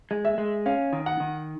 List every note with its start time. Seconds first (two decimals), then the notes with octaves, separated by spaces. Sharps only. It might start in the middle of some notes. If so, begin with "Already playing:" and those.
0.11 G#3
0.25 E5
0.38 G#3
0.66 C#4 F5
0.93 D#3
1.06 F#5
1.20 D#3